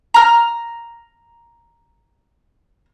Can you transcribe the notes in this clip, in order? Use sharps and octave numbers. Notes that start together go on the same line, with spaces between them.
A#5 F6